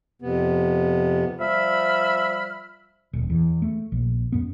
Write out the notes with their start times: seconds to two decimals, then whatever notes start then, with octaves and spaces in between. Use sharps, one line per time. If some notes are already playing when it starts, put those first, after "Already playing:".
0.22 F2 C3 B3
1.40 F3 G3 E5 B5 E6 F6
3.13 D#1
3.30 E2
3.62 A3
3.92 A#1
4.32 F#2 B3